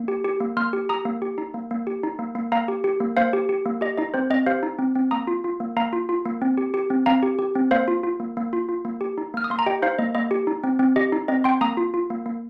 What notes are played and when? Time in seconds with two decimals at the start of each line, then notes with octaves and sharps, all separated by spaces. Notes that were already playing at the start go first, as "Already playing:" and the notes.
Already playing: A#3
0.08 G4
0.25 G4
0.40 A#3
0.57 A#3 C6 F6
0.73 G4
0.89 G4 A#5 D#6
1.05 A#3
1.22 G4
1.38 D#4
1.54 A#3
1.71 A#3
1.87 G4
2.03 D#4
2.19 A#3
2.35 A#3
2.52 A#3 F5 A#5
2.68 G4
2.84 G4
3.00 A#3
3.17 A#3 C5 F5
3.33 G4
3.49 G4
3.66 A#3
3.81 G4 D#5
3.97 D#4 D#5
4.14 C4 C5
4.30 C4 D#5
4.46 G4 C5 F5
4.63 D#4
4.79 C4
4.95 C4
5.11 A#3 A#5 D#6
5.27 F4
5.44 F4
5.60 A#3
5.76 A#3 F5 A#5
5.93 F4
6.09 F4
6.25 A#3
6.42 C4
6.58 G4
6.74 G4
6.90 C4
7.06 C4 F5 A#5
7.23 G4
7.39 G4
7.55 C4
7.71 A#3 C5 F5
7.88 F4
8.04 F4
8.20 A#3
8.37 A#3
8.53 F4
8.69 F4
8.85 A#3
9.01 G4
9.18 D#4
9.34 A#3 F6
9.44 D#6
9.50 A#3 C6
9.59 A#5
9.66 G4 D#5 G5
9.82 D#4 C5 F5
9.99 A#3 D#5
10.15 A#3 D#5
10.31 G4
10.47 D#4
10.64 C4
10.79 C4
10.96 G4 D#5
11.12 D#4
11.28 C4 D#5
11.44 C4 G5 C6
11.61 A#3 A#5 D#6
11.77 F4
11.94 F4
12.10 A#3
12.26 A#3